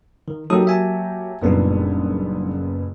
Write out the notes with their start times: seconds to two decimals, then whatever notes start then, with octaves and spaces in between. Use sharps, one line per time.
0.28 D#3
0.50 F#3 A#3 D#4 G4 A4 D#6
0.67 E5 G#5 A5
1.42 F#1 A#2 G3 B3 D4 D#4